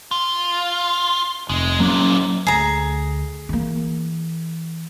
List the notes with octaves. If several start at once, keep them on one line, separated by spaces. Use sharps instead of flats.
F4
F1 G#3
F#2 A#2 F#3 A#3 C#4
D2 G#4 A#5
E3 A#3